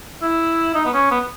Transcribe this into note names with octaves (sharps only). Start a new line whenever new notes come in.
E4
D#4
B3
C#4
B3